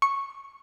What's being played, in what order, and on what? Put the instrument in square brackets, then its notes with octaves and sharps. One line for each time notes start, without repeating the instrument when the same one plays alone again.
[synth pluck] C#6